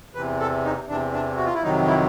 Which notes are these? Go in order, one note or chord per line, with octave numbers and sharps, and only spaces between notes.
E2 C3 E3 B4
A4
D#4
E2 C3 E3 D4
D4
F#4
F4
E4
F2 C3 D#3 F#3 D#4
E4